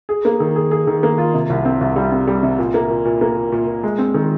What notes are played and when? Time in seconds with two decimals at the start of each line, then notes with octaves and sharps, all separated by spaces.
0.09 G#4
0.25 A#3
0.40 D#3
0.56 G#4
0.71 G#4
0.87 D#3
1.03 A#3
1.18 F4
1.34 C3
1.50 C2
1.65 C4
1.81 C2
1.96 G3
2.12 C4
2.27 G3
2.43 C3
2.59 A#2
2.74 A#3
2.90 A#2
3.05 A#2
3.21 A#3
3.37 A#2
3.52 A#2
3.67 A#2
3.83 G#3
3.99 C4
4.14 D#3